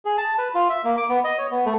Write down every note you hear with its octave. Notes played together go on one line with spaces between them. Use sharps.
G#4
A5
B4
F4
E5
A#3
D6
B3
D#5
C#5
B3
A3